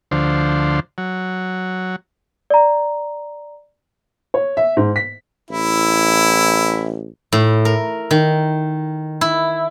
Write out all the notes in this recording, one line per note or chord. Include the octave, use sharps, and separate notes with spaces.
D2 D3 F3 C5
F#3
D5 A#5
C#5
E5
G#2
B6
A1 E4
A2
A#4
D#3
E4